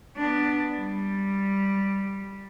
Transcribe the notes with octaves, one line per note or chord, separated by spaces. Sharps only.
B3 D4
G3